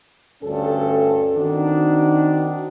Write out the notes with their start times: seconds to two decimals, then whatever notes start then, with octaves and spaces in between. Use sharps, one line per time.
0.43 D2 G2 C#4 A4
1.35 D#3 C4 D4 D#4 F#4